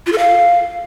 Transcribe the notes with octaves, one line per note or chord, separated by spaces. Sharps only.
F4
A4
F5